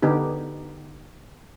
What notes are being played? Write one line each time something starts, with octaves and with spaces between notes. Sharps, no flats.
D3 B3 D#4 G4